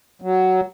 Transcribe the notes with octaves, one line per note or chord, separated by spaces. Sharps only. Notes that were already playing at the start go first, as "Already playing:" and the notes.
F#3